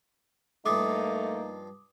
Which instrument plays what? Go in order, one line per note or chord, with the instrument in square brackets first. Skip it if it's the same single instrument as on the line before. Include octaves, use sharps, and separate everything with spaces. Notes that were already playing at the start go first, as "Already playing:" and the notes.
[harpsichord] G2 F3 F4 [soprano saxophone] A3 [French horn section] A#3 D#4 [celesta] D6 D#6